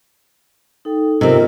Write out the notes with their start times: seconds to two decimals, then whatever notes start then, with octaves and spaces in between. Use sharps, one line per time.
0.85 D#4 A4 G5
1.21 C3 B3 C4 F4 A#4 D#5